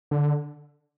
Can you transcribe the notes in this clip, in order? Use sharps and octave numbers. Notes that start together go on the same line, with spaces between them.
D3